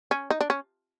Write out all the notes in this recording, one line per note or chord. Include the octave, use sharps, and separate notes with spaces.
C#4
D#4
D4
C#4